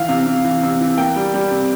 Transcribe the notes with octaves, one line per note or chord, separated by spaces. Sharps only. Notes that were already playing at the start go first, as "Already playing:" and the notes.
Already playing: E3 F5
C3
C3
E3
C3
E3
A#3 G5
G3
G3
C3